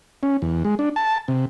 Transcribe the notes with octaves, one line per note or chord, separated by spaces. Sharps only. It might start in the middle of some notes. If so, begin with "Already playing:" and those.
C#4
E2
G#3
D4
A5
C3